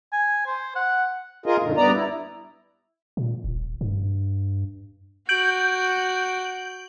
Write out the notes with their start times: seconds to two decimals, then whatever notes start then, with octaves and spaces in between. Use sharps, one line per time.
0.13 G#5
0.47 C5
0.76 F#5
1.46 F4 G#4 A#4 D#5
1.63 F#2 A#2 D3 D#3
1.77 G2 B3 D5 A#5
1.93 E4
3.17 A#2
3.44 D#1
3.81 G2
5.29 F#4 G6 D7 F#7